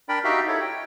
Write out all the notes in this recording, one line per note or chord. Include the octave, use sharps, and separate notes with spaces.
D4 A#4 D5 G5 B5
D#4 F#4 G4 E5 F5 G5
E4 A4 C#5
G5